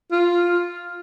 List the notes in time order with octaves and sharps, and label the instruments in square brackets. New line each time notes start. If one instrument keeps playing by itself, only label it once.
[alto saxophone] F4